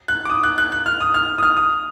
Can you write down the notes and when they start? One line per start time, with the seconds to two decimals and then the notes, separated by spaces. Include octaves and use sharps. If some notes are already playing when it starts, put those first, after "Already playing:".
0.08 F#6
0.25 D6
0.30 D#6
0.43 F#6
0.58 F#6
0.72 F#6
0.86 F6
1.00 D#6
1.14 F6
1.38 D#6
1.43 F6
1.57 D#6